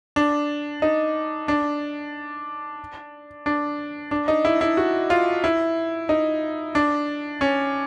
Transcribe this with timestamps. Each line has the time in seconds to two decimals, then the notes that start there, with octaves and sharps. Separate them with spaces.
0.16 D4
0.82 D#4
1.48 D4
3.46 D4
4.11 D4
4.28 D#4
4.45 E4
4.61 E4
4.77 F#4
5.10 F4
5.44 E4
6.09 D#4
6.75 D4
7.41 C#4